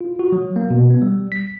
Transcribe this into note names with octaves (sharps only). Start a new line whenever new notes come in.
F4
F#4
F#3
A#3
B2
B3
G3
B6